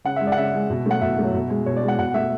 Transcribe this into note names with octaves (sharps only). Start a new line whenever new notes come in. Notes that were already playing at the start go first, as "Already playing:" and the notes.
C#3 F#5
G#3 E5
D5
F#5
C#3 E5
G#3
B2
F#3 A3 F#5
B2 E5
F#3 A3
B2
G#3
B2 C#5
D5
G#3
F#5
B2 F#5
A3 E5